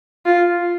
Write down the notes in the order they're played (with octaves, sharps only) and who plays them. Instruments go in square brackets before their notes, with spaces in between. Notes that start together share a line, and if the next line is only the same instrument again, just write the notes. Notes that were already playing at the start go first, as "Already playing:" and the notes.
[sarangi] F4